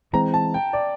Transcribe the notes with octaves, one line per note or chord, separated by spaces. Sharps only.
E3 G#3 C4 A#5
A5
G5
D5